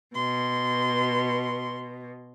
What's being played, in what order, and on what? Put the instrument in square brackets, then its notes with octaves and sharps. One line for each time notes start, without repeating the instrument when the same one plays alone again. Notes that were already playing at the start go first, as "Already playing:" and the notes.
[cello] B2 [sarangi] C6